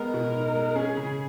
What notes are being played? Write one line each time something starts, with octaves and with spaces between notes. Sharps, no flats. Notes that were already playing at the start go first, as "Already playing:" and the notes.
Already playing: G#3 B3 A#4
B2
D#4
G#3
C#4 G#4
C#3